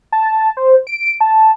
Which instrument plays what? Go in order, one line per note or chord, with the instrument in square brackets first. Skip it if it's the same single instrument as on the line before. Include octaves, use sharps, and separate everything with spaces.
[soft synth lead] A5
C5
D7
A5